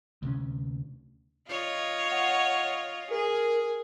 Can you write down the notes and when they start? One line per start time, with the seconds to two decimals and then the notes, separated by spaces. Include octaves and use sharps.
0.23 D2 C3 C#4
1.48 F4 C#5 D#5
2.11 F#5
3.11 G#4 A#4